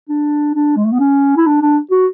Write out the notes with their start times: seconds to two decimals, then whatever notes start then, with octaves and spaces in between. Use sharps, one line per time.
0.09 D4
0.55 D4
0.76 G#3
0.85 A3
0.92 B3
1.00 C#4
1.37 E4
1.47 D4
1.62 D4
1.91 F#4